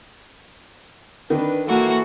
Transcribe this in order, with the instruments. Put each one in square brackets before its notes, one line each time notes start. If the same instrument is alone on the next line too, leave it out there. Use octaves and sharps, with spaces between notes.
[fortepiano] D#3 [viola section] D4 B4
[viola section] E3 E4 A4 [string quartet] A#3 F#4